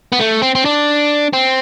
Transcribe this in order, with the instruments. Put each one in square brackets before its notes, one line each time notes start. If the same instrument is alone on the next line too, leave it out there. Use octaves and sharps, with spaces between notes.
[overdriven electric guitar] B3
A3
C4
C4
D4
C4